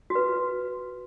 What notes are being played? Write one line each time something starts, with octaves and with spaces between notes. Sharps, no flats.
F#4
B4